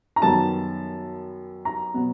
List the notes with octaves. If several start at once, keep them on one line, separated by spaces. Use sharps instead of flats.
A#5
F#2 D#3 G3 B3 A5
A#5
B2 F#3 B3